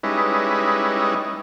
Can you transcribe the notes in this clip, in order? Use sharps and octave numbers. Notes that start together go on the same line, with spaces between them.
G3 G#3 C#4 D#4 E4 B4